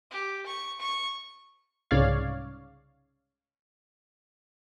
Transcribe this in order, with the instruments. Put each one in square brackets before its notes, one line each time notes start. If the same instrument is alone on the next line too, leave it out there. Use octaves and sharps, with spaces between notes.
[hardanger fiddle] G4
C#6
C#6
[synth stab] C2 G#2 C#3 C#5 D5 F5